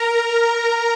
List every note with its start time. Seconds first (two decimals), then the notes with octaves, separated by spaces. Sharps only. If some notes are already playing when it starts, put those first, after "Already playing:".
Already playing: A#4 A#5